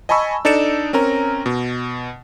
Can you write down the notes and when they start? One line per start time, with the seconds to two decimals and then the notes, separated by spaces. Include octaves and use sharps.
0.09 D#5 G#5 A5 B5 C#6 E6
0.45 D4 D#4 A4 D5 C#7 E7
0.93 C4 C#4 A#4 A#5
1.46 B2